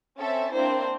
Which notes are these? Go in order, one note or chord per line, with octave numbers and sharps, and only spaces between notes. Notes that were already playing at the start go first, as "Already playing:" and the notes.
C4 C#4 A4 E5 A6
A#3 C4 D4 E4 C5